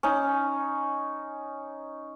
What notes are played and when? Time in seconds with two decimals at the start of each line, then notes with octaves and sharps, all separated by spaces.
0.03 C#4 D#4